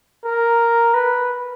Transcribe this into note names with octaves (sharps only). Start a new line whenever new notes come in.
A#4
B4